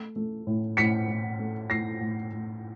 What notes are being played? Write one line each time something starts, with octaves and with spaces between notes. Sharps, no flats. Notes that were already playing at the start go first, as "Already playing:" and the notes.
Already playing: A3
A3
A2
A2 B6 C#7
A2
A3
A3 A#6 C7
A2
A2